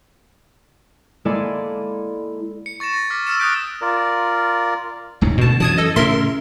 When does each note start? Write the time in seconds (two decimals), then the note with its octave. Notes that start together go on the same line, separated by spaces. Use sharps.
1.25 G#3 A#3 E4 A4 D5 G#5
2.66 C#7
2.80 C#6 A6 A#6 E7
2.93 A#6
3.10 D6 F6 B6
3.27 E6 F6 A6 C#7 E7
3.39 D#6 E6 F#6 G6 B6 D7
3.81 F4 A#4 D5
5.21 D1 G#2 C#3
5.38 D2 B2 A5
5.60 F#2 E3 F#3 A5 D#6 G#6
5.78 A4 D#5
5.96 A2 C#3 C#4 A#4 E5 C6